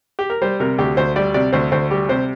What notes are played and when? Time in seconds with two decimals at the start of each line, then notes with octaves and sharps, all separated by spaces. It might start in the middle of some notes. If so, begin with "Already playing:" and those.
0.19 G4
0.30 A#4
0.42 G3 C5
0.60 C3 A#4
0.78 D2 G4
0.97 D2 C5
1.16 G3 D5
1.34 C3 D5
1.53 D2 C5
1.72 D2 C5
1.91 G3 G4
2.09 C3 C5